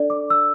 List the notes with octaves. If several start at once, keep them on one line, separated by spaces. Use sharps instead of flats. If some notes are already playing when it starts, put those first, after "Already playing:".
Already playing: D4 A4 D5
D6
E6